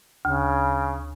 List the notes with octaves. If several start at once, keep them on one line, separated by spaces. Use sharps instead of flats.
D2 C#3